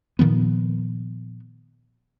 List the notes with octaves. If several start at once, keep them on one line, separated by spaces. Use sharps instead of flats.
A#2 D#3 F3 B3